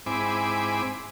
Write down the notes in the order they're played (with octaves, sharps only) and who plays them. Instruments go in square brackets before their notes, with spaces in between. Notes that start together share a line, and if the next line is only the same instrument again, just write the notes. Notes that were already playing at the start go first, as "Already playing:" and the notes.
[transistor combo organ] G#2 C4 E4 G#5 B5 D6